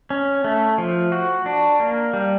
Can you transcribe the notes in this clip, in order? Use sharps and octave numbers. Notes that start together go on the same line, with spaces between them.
C#4
A3
F3
F#4
D4
A#3
G3